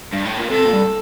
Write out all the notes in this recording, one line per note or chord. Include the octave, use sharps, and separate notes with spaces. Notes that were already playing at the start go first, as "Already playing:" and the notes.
G2
A2
A#2
C3 A4
A#2
G2